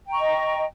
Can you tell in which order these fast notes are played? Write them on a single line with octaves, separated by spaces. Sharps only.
G5 A#5 C#6 D#5